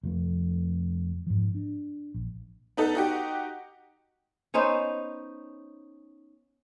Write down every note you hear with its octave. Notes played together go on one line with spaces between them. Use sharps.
F1 F3 A3
G#2 F3
D4
A#1
B3 D#4 A4
D#4 F#4 G4
B3 C#4 D#4 C5